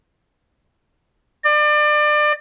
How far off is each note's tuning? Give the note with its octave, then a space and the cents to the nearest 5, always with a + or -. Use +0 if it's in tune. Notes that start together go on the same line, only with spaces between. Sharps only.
D5 +30